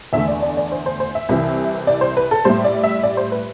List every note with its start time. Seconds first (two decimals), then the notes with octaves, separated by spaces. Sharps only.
0.13 E2 D3 A3 E5
0.28 D5
0.42 D5
0.57 D5
0.72 C5
0.86 C5
1.00 C5
1.15 E5
1.29 C2 C3 E3
1.87 D5
2.01 C5
2.17 B4
2.31 A4
2.45 A2 G3 C5
2.64 D5
2.84 E5
3.03 D5
3.17 C5
3.32 B4